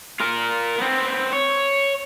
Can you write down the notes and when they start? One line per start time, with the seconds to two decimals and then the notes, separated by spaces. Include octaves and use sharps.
0.20 F4 A#4
0.79 B3 C4
1.33 C#5